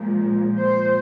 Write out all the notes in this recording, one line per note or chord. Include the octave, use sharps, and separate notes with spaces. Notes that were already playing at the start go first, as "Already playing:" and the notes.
Already playing: A#2 F3 G#3
C5